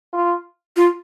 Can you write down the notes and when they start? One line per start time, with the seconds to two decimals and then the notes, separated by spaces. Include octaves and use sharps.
0.13 F4
0.77 F4